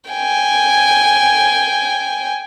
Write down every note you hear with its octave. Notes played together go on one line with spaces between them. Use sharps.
G5 G#5